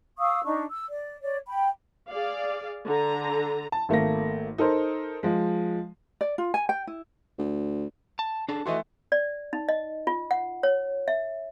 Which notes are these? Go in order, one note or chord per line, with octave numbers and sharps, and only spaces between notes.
F5 C#6 D#6 E6
D4 D#4 C#6
E6
D5
C#5 D5
G5 B5
G#4 D5 F5
D3 A#5
A5
G#1 A3 A#3 A#6
D#4 A4 A#4 C5
F3 G#3
D5
F4
G#5
G5
E4
D2
A5
D4 G#4 A4 A5
E3 A3 F#4 D#5 C6
D5
D#4
D#5
F4
F#5
C#5
E5